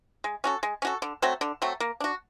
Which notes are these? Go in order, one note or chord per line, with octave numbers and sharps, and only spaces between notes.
G#3
C#4 F#4 A4
G#3
C#4 F#4 A4
D3
F#3 A3 C4
D3
F#3 A3 C4
A#3
D4 F#4